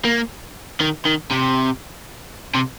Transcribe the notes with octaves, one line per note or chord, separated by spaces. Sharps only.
A#3
D#3
D#3
C3
C3